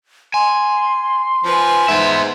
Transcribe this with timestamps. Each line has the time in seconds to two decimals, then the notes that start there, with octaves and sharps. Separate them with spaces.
0.34 G#5 C6
1.44 F3 B4 G#5
1.88 G#2 B3 E5